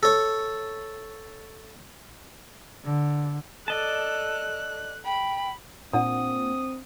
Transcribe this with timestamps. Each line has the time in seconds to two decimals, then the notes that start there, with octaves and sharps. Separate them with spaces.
0.03 A4 C#5
2.85 D3
3.68 A4 D5 D#5 A5 F#6
5.05 G5 B5
5.93 A#2 C4 D4 F#5 A#5 D#6